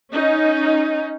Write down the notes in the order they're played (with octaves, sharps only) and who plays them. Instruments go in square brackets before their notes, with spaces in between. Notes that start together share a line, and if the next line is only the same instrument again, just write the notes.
[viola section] C#4 D#4